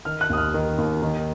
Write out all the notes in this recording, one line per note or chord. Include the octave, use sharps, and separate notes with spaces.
D#3 F6
F#6
D#2 D#6
F6
D#3
D#2
D#3